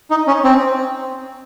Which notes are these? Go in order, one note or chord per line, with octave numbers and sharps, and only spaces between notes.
D#4
C#4
C4